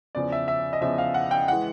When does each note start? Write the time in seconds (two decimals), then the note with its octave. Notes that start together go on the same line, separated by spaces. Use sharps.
0.15 E2 C#3 F3 D5
0.32 E5
0.48 E5
0.73 D#5
0.81 E2 C#3 F3 E5
0.98 F5
1.14 F#5
1.31 G5
1.48 E3 G#3 F#5